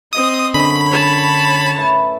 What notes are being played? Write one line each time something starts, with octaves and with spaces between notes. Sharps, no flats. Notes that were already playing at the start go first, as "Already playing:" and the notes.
C4 D#5 D#6
F#2 D3 C#4 B5
C#5 A5
A2 E4 B4